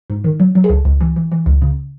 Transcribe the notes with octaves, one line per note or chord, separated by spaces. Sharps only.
G#2
D#3
F#3
F#3
G#4
C#2 A4
C#2
E3
E3
E3
C#2
C#3